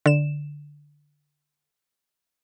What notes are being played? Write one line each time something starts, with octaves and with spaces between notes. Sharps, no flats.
D3 E7